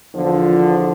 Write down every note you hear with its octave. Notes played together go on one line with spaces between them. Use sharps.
E2 D3 F3